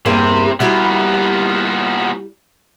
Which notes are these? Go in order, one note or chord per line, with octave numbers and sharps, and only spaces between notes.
E2 G2 C3 A#3
A#2 G3 B3 E4 F#4